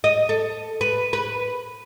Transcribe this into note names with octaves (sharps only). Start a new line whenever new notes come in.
D#5
A4
B4
B4